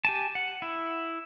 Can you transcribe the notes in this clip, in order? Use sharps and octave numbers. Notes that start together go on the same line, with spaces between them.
G4 G#5 A5
F#5
E4